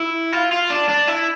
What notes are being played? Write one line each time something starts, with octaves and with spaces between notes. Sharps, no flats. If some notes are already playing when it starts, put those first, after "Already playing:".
Already playing: E4
F4
F4
D4
D4
E4